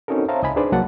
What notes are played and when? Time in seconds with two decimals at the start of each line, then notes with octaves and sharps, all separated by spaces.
0.08 C4 C#4 D#4 F#4 A4 A#4
0.29 C5 C#5 E5 F5 A5 A#5
0.42 C#2 D#5 G#5 B5
0.56 D4 D#4 G#4 B4 C5 D5
0.72 C2 F#3 A#3 F#5 A5